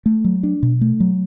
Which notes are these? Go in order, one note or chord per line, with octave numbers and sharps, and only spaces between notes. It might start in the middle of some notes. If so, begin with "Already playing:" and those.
A3
F#3
D4
B2
A3
F#3